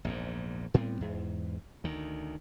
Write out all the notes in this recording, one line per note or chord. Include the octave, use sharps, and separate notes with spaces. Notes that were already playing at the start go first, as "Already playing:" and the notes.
A#1 E2 G#2
A2 G3 B3 C4
E2 G#2
D2 D#3